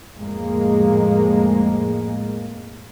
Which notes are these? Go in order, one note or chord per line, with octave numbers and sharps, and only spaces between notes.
F2 A2 G#3 A#3